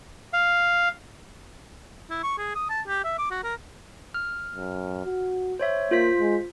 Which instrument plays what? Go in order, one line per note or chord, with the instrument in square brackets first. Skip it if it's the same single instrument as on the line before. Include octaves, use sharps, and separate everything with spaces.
[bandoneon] F5
[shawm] E4
C#6
G#4
D#6
A5
G4
E5
D6
F#4
A#4
[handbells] F6
[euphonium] F#2
F#4
[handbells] C5 C#5 E5
[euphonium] A#3 [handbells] F4 C5 B6
[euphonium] G#3